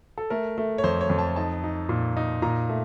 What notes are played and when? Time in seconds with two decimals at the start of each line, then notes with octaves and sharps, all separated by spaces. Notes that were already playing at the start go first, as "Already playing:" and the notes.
0.18 A4
0.30 A3 A#4
0.58 A3
0.78 C#5
0.84 F2 C5
1.01 C#5
1.10 F2
1.18 A5
1.36 D#4 A5
1.64 D#4
1.89 A#2
2.17 D#4
2.42 A#2 A#5
2.69 A3